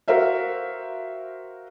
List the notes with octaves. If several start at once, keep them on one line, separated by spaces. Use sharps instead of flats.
F#4 A#4 C5 E5 F5